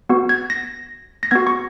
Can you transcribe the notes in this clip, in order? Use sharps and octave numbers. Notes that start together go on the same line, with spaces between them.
B3 F#4
G#6
A#6
A#6
B3 F#4 G#6
C#6